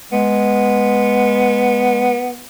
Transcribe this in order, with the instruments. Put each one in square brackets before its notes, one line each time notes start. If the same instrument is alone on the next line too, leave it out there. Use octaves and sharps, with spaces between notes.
[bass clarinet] G#3 [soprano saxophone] B3